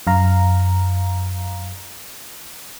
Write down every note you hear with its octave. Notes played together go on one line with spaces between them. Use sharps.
F#2 F5 A#5